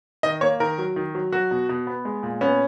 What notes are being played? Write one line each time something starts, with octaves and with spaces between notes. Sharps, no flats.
D#3 D#5
A#3 C#5
D#3 A#4
F#3
D#3
F#3
F#3 F#4
B2
B2
B3
G#3
A#2
B3 C#4